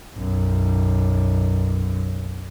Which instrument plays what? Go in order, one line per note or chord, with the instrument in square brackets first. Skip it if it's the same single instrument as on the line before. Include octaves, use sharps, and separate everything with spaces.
[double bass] B1 F#2